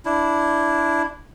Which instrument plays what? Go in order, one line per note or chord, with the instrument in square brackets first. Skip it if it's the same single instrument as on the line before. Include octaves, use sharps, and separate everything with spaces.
[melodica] D4 E4